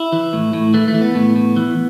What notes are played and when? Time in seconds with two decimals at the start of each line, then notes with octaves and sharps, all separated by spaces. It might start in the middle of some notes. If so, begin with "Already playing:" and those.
Already playing: E4
0.12 E3
0.33 A2
0.53 A2
0.74 E3 A3
0.88 A3
0.94 E3
1.02 B3
1.15 A2
1.36 A2
1.56 E3